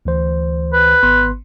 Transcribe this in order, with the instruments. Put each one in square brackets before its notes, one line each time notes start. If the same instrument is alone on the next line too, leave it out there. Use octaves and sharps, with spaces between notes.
[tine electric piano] D2 E3 C5
[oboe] B4
[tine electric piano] G#1 B3 C6